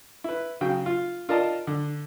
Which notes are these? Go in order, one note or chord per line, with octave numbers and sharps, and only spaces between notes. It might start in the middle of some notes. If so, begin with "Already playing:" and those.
E4 B4
C#3 F#3 G5
F4
F4 A#4 D5 D#5 A5
D3